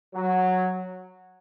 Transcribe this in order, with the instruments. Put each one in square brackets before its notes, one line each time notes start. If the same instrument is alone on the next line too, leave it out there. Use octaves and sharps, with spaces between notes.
[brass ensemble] F#3